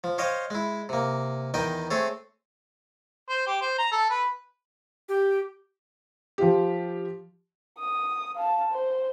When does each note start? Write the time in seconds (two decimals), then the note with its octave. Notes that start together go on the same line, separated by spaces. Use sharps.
0.04 F3
0.18 C5 C#5 D#5 F5 G5
0.50 G#3 E4
0.89 C3 A#3
1.54 E2 D#3 D#4 D#5 G5
1.90 A3 C4 G#4 A4 C#5
3.29 C5
3.47 G4
3.62 C5
3.78 A#5
3.92 A4
4.10 B4
5.09 G4
6.38 F3 F4 G4
7.79 D#6
8.36 F5 A5
8.72 C5